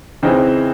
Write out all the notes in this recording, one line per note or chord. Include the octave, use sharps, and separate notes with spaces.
C#3 E3 C4 D#4